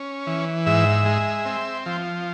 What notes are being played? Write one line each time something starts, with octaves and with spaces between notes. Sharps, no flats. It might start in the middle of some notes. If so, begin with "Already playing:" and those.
Already playing: C#4
E3
G#2 E5
G#3
C4
F3